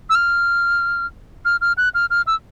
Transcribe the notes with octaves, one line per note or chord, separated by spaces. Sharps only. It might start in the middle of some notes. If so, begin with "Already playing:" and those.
E6
F6
F6
F6
F#6
F6
F6
E6